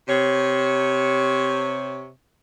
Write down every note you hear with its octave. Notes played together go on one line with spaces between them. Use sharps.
C3 C#5